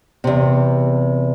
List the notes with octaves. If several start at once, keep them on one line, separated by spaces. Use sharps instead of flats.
E2 C3